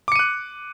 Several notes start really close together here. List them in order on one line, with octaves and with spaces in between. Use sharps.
D6 C#7 D#7 F#6